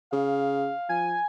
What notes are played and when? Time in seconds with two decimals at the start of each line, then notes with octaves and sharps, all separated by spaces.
0.12 C#3 F5
0.89 F3 G#5